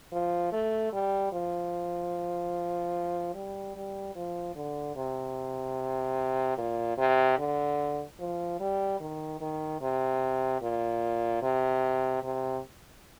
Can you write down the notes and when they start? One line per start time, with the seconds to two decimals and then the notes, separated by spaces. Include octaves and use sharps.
0.12 F3
0.52 A3
0.92 G3
1.32 F3
3.34 G3
3.75 G3
4.15 F3
4.56 D3
4.96 C3
6.57 A#2
6.97 C3
7.38 D3
8.20 F3
8.60 G3
9.00 D#3
9.41 D#3
9.81 C3
10.61 A#2
11.42 C3
12.23 C3